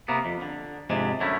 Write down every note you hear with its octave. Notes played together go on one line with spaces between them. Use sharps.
C3 A#3 B3
F2
D3
F2 G#2 C3 G#3 D4
F#2 D3 A3 C#4 E4